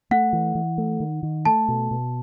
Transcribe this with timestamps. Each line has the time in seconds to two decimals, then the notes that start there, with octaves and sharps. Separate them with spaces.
0.11 A3 F#5
0.33 E3
0.55 E3
0.78 A3
1.00 D#3
1.23 D#3
1.45 A3 A5
1.68 B2
1.91 B2